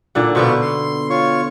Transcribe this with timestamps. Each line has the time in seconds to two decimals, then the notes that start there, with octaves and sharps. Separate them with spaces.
0.15 A#2 D3 F#5
0.35 B2 D3 B3 F4 C5 C#6
0.62 C6
1.10 F4 C#5 C#6